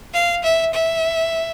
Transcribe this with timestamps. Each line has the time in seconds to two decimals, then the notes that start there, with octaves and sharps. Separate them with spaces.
0.14 F5
0.44 E5
0.73 E5